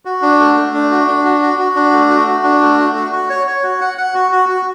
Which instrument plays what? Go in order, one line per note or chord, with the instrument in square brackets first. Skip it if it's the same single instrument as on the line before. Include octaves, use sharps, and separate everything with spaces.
[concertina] F#4
D4
A3
A3
D4
F#4
D4
F#4
F#4
F#4
D4
A3
F#4
F#4
D4
A3
F#4
F#4
F#4
C#5
C#5
F#4
F#5
F#5
F#4
F#4
F#4